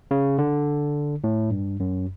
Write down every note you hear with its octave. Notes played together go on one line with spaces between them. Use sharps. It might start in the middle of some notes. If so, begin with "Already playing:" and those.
C#3
D3
A2
G2
F#2